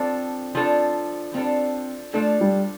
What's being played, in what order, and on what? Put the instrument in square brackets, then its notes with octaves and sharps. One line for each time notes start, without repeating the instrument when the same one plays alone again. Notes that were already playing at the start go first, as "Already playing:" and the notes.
Already playing: [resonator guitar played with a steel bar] F3 D4 A4 [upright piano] C4
[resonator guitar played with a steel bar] F3 D4 A4
[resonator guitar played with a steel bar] F3 D4 A4 [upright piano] C4
[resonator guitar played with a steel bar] F3 D4 A4 [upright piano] A3
[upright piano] G3